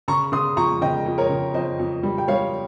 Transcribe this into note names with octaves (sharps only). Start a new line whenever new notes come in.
C#3 A#5 C#6
C#3 C6 D#6
F2 A#5 C#6
C#3 D#5 G5
F2
A#4 C#5
C#3
F2 C5 D#5
F2
G3
G5
G3 C#5 F5